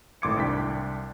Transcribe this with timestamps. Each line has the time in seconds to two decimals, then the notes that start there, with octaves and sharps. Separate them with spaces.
0.22 G#1 A2 C6 D6 G#6 C#7
0.37 C2 D4 G5 B6